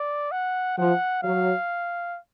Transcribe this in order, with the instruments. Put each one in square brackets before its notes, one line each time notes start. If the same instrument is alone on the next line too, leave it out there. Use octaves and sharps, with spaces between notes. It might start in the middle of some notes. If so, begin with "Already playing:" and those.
Already playing: [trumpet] D5
F#5
[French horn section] F3 [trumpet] F#5
[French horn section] F#3 [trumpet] F5